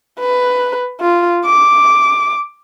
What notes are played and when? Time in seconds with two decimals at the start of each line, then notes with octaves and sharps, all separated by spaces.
0.20 B4
1.00 F4
1.46 D6